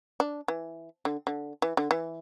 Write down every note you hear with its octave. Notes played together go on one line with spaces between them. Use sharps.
D4
E3
D3
D3
E3
D3
E3